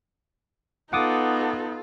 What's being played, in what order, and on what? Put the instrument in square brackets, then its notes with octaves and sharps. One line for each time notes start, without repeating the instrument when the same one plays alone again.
[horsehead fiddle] B3 D#4 [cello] F4 A4 [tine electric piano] F#5 D6 D#6